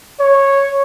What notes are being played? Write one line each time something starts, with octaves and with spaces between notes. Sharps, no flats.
C#5